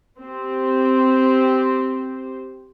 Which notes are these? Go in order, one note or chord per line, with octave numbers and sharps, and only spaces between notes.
C4 G4 C5